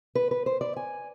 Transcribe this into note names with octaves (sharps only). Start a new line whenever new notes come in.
B4
B4
C5
D5
G#5